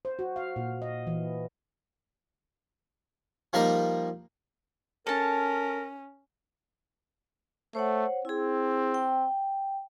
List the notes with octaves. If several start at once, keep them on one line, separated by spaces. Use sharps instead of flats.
C5
F#4
F5
A#2
D#5
E3
F3 G3 A#3 D#4 A#4 D#5
C#4 A4 A#4 A5
A3 C5 C#5 F#5
C4 E4 G#4
G5